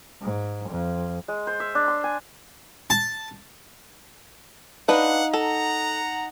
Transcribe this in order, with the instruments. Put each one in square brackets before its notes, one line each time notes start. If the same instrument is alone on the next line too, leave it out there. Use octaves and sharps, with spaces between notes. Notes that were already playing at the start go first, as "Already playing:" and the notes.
[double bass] G#2
F2
[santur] G#3
C5
E5
D4
C6
G#5
[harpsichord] A5
[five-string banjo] D4 B4 [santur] D#4 [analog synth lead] F5 [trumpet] F#5
[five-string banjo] A4 [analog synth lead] F#5 [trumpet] A#5